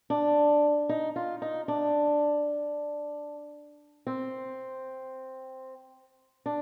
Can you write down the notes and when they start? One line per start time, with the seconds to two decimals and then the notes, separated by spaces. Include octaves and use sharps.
0.10 D4
0.89 D#4
1.16 F4
1.42 D#4
1.68 D4
4.07 C4
6.46 D4